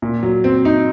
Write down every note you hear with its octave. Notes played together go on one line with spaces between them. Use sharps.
A#2
F#3
C4
D#4